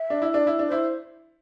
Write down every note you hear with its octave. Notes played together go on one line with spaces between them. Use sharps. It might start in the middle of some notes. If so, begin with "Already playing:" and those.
Already playing: E5
D4
E4
D4 D5
E4
D4
E4 C5